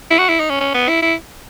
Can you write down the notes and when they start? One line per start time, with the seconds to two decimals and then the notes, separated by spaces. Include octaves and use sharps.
0.11 E4
0.18 F#4
0.29 E4
0.40 D#4
0.49 C#4
0.60 C#4
0.74 B3
0.88 E4
1.02 E4